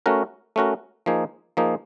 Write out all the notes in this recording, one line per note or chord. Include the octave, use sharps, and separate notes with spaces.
A3 C#4 F#4 A#4
A3 C#4 F#4 A#4
F3 A#3 D#4 G#4
F3 A#3 D#4 G#4